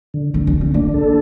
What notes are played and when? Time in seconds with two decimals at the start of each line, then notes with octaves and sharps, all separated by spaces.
0.14 D3
0.34 D3 C4
0.47 D4
0.55 D3
0.61 C4
0.74 A#3 D4
0.94 A4